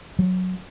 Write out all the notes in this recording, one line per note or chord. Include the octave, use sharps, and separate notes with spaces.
F#3